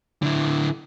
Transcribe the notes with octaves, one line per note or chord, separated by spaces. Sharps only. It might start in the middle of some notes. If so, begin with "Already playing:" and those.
D3 E4